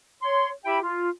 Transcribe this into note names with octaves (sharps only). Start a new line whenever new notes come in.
C#5 C6
E4 G4 E5 G5 B5
F4